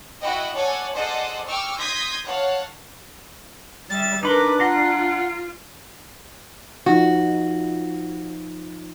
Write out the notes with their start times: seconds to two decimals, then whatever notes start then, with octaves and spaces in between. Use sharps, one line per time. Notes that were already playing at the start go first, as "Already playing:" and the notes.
0.21 E4 F#4 D#5 F#5 G5
0.55 A4 C#5 D5 F#5 G#5
0.95 G#4 A4 C5 D5 D#5 F#5
1.47 G5 C#6 D6 E6 F6
1.78 C6 D#6 G6 G#6 A#6 B6
2.26 C#5 F5 F#5 A5
3.90 G3 E5 A6
4.23 D4 D#4 A#4 B4 B5 C6 D6
4.60 F4 F#5 A#5 C6
6.86 F3 D#4 F#4